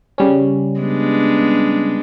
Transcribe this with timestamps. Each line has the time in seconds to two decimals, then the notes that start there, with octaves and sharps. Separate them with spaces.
0.18 C#3 G3 C#4
0.80 G#3 B3 D4